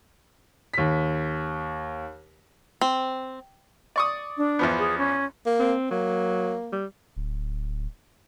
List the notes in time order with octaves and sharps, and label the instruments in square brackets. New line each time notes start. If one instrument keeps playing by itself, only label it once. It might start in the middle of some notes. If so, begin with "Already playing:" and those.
[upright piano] D#2 B6
[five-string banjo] C4
[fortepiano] D5 C#6 D#6
[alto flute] D4
[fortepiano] E2 F3 B3
[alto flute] G#4
C#4
[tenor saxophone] A#3
[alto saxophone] C4
[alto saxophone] F#3 [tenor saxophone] A#3
[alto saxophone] G3
[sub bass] D1